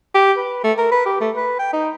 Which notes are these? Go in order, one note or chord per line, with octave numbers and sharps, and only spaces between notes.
G4
B4
A3
A#4
B4
G4
A3
B4
G5
D#4